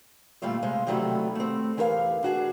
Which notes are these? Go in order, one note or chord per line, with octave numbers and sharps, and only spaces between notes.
A#2 D3 G3 A3 F4 E5
C3 G#3 C5 F5
C3 D#3 F#3 G3 A3 E4
A3 C4
E2 E3 G4 A#4 B4 F5
D4 F#4 G#4